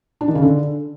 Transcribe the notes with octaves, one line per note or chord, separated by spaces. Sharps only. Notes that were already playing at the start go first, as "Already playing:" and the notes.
D4
D#3
C#3
D3